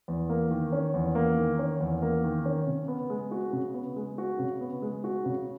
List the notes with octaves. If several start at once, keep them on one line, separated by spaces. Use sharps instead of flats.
E2
A#3
D#3
C#4
E2
A#3
D#3
C#4
E2
A#3
D#3
C#4
C#3
B3
G#3
F#4
C#3
B3
G#3
F#4
C#3
B3
G#3
F#4
C#3